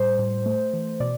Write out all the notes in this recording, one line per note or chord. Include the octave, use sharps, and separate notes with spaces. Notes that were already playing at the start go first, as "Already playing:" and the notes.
Already playing: A2 G3 C5
A2
A3
E3
B2 D5